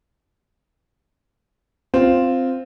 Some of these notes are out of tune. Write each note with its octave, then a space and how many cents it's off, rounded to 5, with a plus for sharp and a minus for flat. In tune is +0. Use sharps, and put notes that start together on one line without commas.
C4 +0 F4 +0